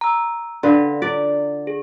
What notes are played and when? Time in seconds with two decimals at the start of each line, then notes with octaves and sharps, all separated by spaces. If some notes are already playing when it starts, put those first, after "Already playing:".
0.01 A#5 E6
0.63 D3 D4 B4 F5 C6
1.02 F4 D5
1.67 G#4